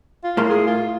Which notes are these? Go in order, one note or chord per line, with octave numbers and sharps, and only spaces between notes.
F4
A2 A#4 C6
G#4
F4